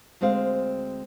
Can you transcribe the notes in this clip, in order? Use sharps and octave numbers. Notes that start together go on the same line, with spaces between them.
D2 G#3 C4 C5 F5